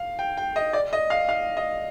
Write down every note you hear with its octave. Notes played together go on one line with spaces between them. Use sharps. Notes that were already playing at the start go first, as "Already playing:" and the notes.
Already playing: F5
G5
G5
D#5
D5
D#5
F5
F5
D#5